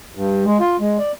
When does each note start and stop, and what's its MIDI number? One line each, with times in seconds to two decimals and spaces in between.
0.15 0.45 43
0.45 0.58 56
0.60 0.77 65
0.80 0.98 56
0.99 1.12 74